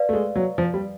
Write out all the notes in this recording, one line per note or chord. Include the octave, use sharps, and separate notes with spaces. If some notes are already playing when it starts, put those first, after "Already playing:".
Already playing: B4 D5 F5
A3
G#3
F#3
F3
G3